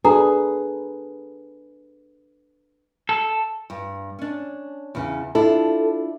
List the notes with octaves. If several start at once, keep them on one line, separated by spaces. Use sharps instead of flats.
D4 G#4 A4 B4 A#5
A4
G2
C#4 D4
E2 C#3
D4 E4 F4 A4